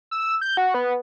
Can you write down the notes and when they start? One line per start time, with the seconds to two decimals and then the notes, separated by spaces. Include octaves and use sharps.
0.11 E6
0.41 G6
0.57 F#4
0.74 B3